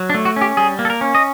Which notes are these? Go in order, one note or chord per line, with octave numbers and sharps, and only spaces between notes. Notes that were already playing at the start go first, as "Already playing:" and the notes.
Already playing: F#3
D4
A3
F#4
C#4
G4
G3 G#4
A#3
A4
A#4
C#4
D#5